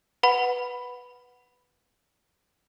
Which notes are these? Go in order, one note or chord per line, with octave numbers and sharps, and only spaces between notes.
B4 F#5 B5